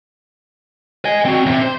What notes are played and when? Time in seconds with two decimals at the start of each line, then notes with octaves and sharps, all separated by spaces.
1.05 D#5 G#5
1.25 C4 F#4
1.46 E2 C3
1.62 C5